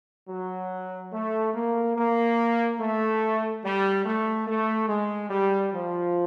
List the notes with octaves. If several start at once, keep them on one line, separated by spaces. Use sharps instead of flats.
F#3
A3
A#3
A#3
A3
G3
A3
A3
G#3
G3
F3